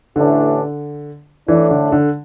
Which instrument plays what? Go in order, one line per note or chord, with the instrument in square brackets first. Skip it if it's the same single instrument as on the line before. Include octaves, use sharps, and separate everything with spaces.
[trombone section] A1 A2 E3 A3 D4 [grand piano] D3
[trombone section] A2 A3 D4 [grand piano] E3
[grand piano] D3
D3